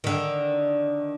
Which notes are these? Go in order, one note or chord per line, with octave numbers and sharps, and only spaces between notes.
D3 D#3